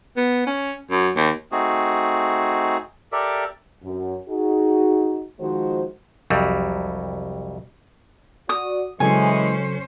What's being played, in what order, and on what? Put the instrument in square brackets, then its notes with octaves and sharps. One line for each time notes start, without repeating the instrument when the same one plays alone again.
[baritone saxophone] B3
C#4
F#2
D#2
[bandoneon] A3 C4 D#4 F#4 G#4
G4 A4 A#4 D5 E5
[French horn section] F#2
D#4 F#4 G#4
D#3 F3 G#3 F#4 C5
[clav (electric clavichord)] C2 F2 F#3 G3
[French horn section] F#4 D5 [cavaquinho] D#6
[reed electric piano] C#3 F#3 A4 [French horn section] E3 G#3 [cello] C#4 C5 [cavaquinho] G#5